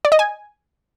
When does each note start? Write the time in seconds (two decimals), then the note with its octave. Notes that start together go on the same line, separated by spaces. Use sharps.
0.05 D5
0.12 D#5
0.19 G#5